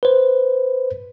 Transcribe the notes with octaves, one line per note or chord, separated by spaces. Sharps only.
B4 C5